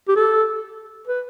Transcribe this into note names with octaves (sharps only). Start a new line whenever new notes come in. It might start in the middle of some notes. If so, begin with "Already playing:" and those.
G4
A4
B4